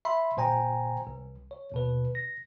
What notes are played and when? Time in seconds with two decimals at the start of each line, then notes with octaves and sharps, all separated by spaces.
0.05 E5 B5 C6
0.37 G1 A#2 C5 G5 G#5 A#5
1.07 C2
1.51 C#5
1.72 D#2 B2 B4
2.15 A#6